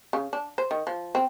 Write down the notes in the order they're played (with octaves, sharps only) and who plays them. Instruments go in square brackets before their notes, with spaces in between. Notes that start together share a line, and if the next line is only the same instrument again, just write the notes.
[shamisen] C#3
D4
C5
D#3
F3
C4